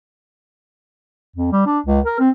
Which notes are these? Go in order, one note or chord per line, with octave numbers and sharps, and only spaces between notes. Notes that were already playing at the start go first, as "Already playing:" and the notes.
F2
G3
D4
C#2
A#4
C4